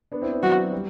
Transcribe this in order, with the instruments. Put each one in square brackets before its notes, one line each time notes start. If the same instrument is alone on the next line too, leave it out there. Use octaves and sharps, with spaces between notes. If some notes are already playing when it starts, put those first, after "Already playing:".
[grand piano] B3 D4
C4 E4
B3 D4
[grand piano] F#3 [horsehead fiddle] F#4
[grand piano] G3